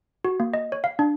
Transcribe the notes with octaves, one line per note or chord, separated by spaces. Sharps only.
F#4
A#3
D#5
C#5
F5
D4